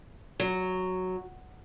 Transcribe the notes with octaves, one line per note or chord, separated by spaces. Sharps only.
F#3